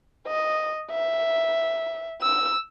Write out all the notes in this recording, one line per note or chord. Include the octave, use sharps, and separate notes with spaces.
D#5
E5
E6